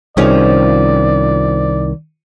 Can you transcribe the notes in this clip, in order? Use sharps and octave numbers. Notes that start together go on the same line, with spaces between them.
C2 D#3 F3 C#4 G#4 D5